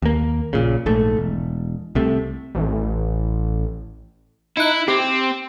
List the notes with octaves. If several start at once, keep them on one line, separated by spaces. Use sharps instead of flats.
D#2 A#3
A#1 A#2 C#3
A#1 G#2 A3
E1
C2 C3 A3
A1
D#4 E4 F#6
C4 G4